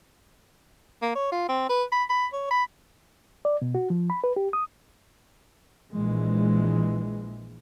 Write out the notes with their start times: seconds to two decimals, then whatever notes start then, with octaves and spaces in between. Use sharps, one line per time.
1.02 A#3
1.15 C#5
1.32 F4
1.49 C4
1.69 B4
1.92 B5
2.10 B5
2.33 C#5
2.51 B5
3.45 D5
3.62 B2
3.75 F#4
3.90 F3
4.10 B5
4.24 B4
4.36 G4
4.53 D#6
5.93 A#1 E3 G#3